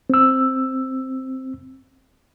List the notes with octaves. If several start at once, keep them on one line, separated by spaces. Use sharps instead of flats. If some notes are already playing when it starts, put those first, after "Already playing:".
C4 E6